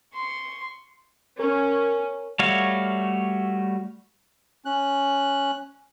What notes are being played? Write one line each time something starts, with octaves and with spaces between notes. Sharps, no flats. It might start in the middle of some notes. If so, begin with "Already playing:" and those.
C6 C#6
C#4 A#4
G3 A3 F#4 C#5 F5
C#4 F#6